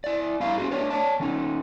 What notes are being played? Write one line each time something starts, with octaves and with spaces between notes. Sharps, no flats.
E4 D5
G2 E4 F5
C#4 F#4 G#4
A3 D4 C#5 D5
C#5 D5 A5
D#3 C#4 D#4